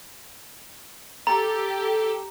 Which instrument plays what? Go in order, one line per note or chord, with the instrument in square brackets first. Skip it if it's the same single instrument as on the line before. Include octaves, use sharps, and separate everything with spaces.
[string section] G4 [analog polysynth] A4 [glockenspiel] A#5